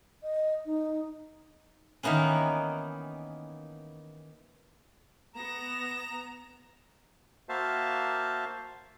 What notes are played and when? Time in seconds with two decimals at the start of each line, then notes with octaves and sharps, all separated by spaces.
0.23 D#5
0.66 D#4
2.03 D#3 E3 A#3 B3 C#4
5.36 B3 A#5 A#6 E7
7.49 A#3 F#4 C5 E5 F5 A5